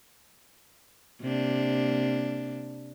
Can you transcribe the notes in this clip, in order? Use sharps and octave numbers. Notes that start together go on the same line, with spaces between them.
C3 A#3 D4